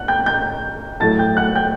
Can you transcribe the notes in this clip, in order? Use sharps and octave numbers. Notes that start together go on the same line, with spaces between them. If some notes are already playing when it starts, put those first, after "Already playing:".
Already playing: F#5 F#6
G5 G6
G5 G6
A2 F#3 A3 A5 A6
G5 G6
F#5 F#6
G5 G6